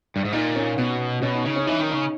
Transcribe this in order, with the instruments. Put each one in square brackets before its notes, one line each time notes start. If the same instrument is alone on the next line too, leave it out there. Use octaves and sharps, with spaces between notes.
[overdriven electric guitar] G2
G#2
[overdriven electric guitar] A#2 [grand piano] D#4
[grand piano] C#4
[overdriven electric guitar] B2 [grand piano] B3
[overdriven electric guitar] B2 [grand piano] C#4
[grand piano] D#4
[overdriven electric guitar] C#3 [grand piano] D#4
[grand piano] C#4
[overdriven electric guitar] E3 [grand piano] D#4
[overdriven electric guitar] D#3
[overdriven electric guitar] C#3 [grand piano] D#4